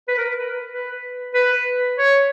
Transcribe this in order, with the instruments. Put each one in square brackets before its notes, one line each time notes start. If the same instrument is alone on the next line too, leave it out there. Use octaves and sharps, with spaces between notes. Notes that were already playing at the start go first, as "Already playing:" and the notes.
[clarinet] B4
A#4
B4
B4
B4
C#5